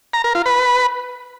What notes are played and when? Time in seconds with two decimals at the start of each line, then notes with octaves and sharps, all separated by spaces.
0.13 A#5
0.24 A#4
0.35 F4
0.46 B4